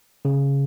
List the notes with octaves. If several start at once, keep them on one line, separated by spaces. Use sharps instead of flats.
C#3